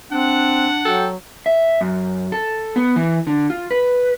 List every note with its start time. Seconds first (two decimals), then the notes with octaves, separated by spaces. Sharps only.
0.12 C4 D4 F#5
0.85 F#3 F#4 A4 G5
1.46 E5
1.81 F#2
2.32 A4
2.76 B3
2.96 E3
3.27 D3
3.50 F4
3.71 B4